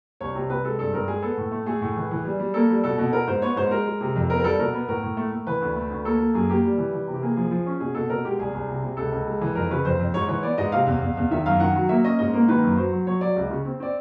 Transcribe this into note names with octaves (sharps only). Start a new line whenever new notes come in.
C2 C#5
C3
C3 B4
G#3 A4
G2 A4
G2 A#4
G#3 G#4
B3 A4
A2
A3
A3 G#4
A2
E3
E3
G3
G3
A#3 A4
G3
B2 A4
B2
B3 A#4
G#2 C5
B3 C#5
G#2 C5
G#3 A#4
G#3
C3
F2
B3 A#4
A#4
G3 A4
B2 A#4
B3
A2 A#4
A2
A3
A3
E3 B4
D2
A3
D2
A#3 A4
A#3
F#2 G#4
A#3 G4
G3
E3
E3
C3
G4
A#3 G#4
F3 G#4
F3
C#4
B2 G#4
B2 A4
B2 A#4
G#3 G4
C2 G#4
C2
C3
C3
C#2 A4
C#2
G#3
E3
F2 A#4
C#3 B4
F2 C5
F2
G#2 C#5
E3 C#5
B3 D5
G#2 D#5
C3 F5
E2
E2
E2
D#3 E5
F#2 F5
D#3 F#5
F#3
A#3 E5
C#4 D#5
G#2 D#5
A#3
D#3 B4
F#2
F#3 C5
F#3
F#3 C#5
F#3 D5
C#2
C#3
C4
C4 D5